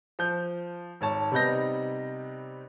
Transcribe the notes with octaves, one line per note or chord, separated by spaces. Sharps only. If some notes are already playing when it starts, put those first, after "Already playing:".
F3 G6
G#1 C#5 A5
C3 G3 B3 D#4 G6 A#6